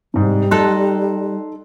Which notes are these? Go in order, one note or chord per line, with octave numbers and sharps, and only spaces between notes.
G#2 C3 G3
D#4 A4 C6 F#6